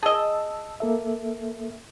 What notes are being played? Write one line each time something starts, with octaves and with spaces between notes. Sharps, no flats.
G#4 D#5 A5 E6
A#3 A4 E5